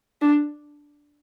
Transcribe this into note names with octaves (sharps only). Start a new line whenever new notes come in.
D4